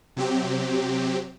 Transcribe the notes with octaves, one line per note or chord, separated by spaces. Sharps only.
C3 F#3 C4 G4